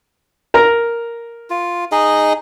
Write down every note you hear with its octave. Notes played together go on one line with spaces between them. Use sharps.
A#4 A#5
F4
D#4 G#4 D#5